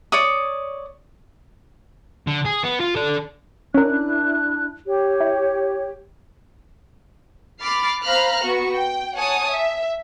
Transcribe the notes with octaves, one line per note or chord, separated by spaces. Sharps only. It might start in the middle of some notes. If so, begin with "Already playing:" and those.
C#5 D5 D#6
D3
G#4
B3
F4
A4 D5
C#4 D4 E4 A#4 F#6
G4 C#5
E4
B5 D6 F6 A6 C7
C5 F5 A#5 B5 F6 F#6
B3 F#4 C#6
G5
C#5 F#5 G#5 A5 D#6
E5